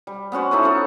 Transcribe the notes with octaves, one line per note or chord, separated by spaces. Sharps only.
G3
B3 C#4 F#4 C5
D#4 E4 A4 B4
C#4 F4 A4 F#5